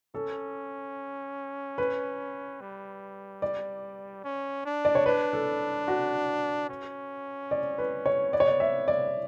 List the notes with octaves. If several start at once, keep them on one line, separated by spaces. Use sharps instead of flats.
C#4 A4
B4
G3
D5
C#4
D4
D5
C#5
D4 B4
A4
F#4
C#4
D5
B4
C#5
B3 D5
C#5
D5
E5
D5